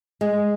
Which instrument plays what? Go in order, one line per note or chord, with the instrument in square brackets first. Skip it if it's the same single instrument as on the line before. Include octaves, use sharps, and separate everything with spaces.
[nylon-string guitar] G#3